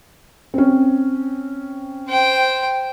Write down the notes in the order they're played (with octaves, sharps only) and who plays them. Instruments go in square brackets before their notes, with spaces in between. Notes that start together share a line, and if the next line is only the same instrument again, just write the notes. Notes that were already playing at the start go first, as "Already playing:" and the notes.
[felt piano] C4 C#4
[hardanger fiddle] C5 G5